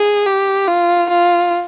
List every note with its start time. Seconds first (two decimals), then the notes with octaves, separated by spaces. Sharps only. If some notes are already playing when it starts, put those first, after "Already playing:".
Already playing: G#4
0.26 G4
0.68 F4
1.09 F4